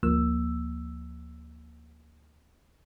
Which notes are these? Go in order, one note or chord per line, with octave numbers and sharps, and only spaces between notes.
G1 D2 F3 A#3 E6